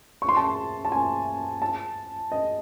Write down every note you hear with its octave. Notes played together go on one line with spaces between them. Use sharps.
C#6
C6
A5
C6
A5
G#5
A5
D#5